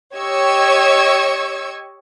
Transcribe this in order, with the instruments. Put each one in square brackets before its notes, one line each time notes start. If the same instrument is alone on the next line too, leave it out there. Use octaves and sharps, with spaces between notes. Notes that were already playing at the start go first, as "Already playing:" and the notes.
[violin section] G4 C#5 D#5 C#6 E6 G#6